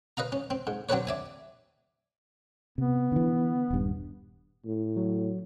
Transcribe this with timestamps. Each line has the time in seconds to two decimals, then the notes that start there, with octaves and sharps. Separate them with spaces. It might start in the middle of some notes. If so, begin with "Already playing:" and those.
0.17 B4 D#5 F5 A#5
0.32 C#4
0.50 C4
0.67 G#2
0.89 F#3 C4 D4 A4 B4 C#5
1.07 D5 E5 G#5
2.78 C3 B3
3.12 D3 E3
3.70 D#1 G2
4.65 A2
4.97 F#3